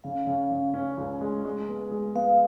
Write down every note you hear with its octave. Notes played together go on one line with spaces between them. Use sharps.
C#3 F5
C#3
C#3
C#4
C#2
G#3
G#3
B3
G#3
B3 F5